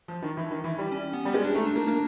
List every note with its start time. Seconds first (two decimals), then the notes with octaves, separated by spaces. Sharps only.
0.08 F3
0.22 D#3
0.37 E3
0.51 D#3
0.64 E3
0.78 G3
0.92 C#4
1.13 B3
1.25 G3
1.33 G#3 C#4
1.45 D4
1.54 A3 D#4
1.65 D4
1.76 A#3
1.87 A#3